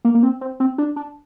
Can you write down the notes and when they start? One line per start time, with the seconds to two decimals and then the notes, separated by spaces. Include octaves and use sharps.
0.05 A#3
0.15 A#3
0.23 C4
0.41 C4
0.60 C4
0.78 D4
0.96 D4